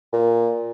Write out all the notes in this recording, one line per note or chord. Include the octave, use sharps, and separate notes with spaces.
A#2